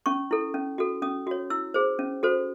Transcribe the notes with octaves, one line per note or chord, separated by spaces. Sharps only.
C#4 C#6
E4 A4
C#4
F#4 A4
C#4 D#6
F#4 C#5
E4 E6
G#4 C5
C#4
F#4 A4 C5